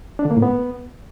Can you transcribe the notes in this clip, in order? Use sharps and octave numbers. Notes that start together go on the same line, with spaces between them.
D4
D3
A#3
A2
B3